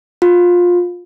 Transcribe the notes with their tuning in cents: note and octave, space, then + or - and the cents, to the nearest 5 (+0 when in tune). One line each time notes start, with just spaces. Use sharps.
F4 +20